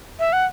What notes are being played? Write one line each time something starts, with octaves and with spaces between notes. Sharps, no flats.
E5
F#5